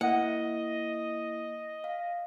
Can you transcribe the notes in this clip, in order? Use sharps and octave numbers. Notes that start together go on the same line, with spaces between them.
A#3 E4 D#5 F#5
F5